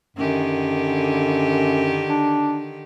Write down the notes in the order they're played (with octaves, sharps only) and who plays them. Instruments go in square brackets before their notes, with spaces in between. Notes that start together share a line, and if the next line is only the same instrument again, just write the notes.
[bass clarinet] F#2 [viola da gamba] D3 D#3 G4
[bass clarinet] D4